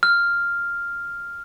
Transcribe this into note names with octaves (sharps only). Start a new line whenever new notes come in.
F6